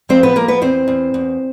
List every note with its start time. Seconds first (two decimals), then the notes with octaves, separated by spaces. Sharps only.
0.09 F3 C4 C5
0.23 B3 B4
0.36 F3 A#3 A#4
0.48 B3 B4
0.62 E2 C4 C5
0.88 E2
1.14 E2